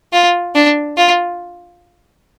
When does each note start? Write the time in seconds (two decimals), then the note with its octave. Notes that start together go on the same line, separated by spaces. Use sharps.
0.13 F4
0.55 D4
0.97 F4